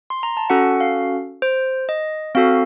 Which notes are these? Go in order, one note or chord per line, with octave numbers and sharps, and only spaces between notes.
C6
A#5
A5
C#4 F#4 A4 F#5
F5
C5
D#5
C4 F#4 A4 F5